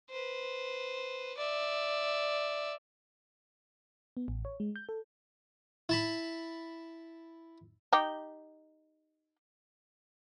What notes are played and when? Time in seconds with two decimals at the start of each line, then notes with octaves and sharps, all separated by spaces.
0.10 B4 C5
1.37 D5 E5
4.17 B3
4.28 A1
4.45 C#5
4.60 G#3
4.76 G6
4.89 A4
5.89 E4 A5 B5
7.93 D#4 G4